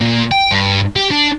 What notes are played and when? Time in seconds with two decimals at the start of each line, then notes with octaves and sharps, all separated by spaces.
0.01 A#2
0.31 G5
0.51 G2
0.96 G4
1.11 D4